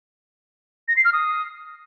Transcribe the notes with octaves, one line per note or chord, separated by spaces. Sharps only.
A#6
C7
F6
D#6